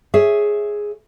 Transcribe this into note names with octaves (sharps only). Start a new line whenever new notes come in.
G#4 C#5 E5